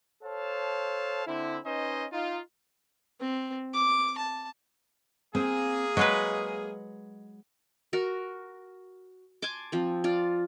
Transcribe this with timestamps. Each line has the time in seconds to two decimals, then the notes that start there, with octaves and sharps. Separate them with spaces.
0.24 A4 C5 C#5 F5 A5
1.27 D3 C4 E4
1.65 C#4 D#4 B4 C5 D#5
2.11 D#4 F4
3.21 C4
3.74 D6
4.18 A5
5.35 A#3 C4 G#4
5.97 F#3 G#3 B4 D#5
7.93 F#4 A#4
9.42 G#5 A5 C6 D6
9.72 F3 C4
10.04 F4 D5